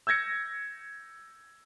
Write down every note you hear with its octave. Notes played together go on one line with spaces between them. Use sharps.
E6 G6 G#6 A#6 C#7